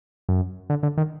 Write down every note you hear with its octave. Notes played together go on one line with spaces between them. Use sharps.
F#2
D3
D3
D#3